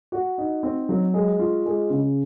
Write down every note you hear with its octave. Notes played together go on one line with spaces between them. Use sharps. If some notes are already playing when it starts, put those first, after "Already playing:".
F#4
D#4
C4
F#3
G#3
F4
G#3
C#3